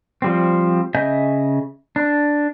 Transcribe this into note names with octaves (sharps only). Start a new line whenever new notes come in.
F3 G3 C4
C#3 D#5 E5 G#5 G6
D4